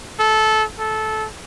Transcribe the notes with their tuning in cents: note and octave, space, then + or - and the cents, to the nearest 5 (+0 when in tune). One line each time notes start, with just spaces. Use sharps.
A4 -15
A4 -15